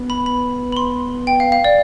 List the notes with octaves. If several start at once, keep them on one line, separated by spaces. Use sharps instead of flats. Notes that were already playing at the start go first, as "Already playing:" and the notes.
Already playing: B3
B5
B5
B5
C6
G5
F5
F5
D5